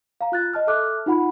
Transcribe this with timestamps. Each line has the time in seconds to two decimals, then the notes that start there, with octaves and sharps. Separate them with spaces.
0.21 F5 A#5
0.32 F4 F#6 A6
0.54 D#5 A5 F6
0.67 A4 E5 A5 D6 F6 F#6
1.06 D#4 F4 F#5 B5